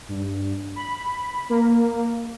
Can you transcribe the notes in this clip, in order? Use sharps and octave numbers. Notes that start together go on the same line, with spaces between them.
G2
B5
A#3